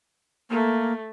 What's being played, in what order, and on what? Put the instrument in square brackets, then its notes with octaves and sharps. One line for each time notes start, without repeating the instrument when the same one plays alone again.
[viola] A3 [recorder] A#3